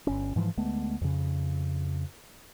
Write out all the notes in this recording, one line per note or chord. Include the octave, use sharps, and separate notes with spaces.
G1 C#4
G#2 E3 F3
D2 G#3 A3 B3
F2 C#3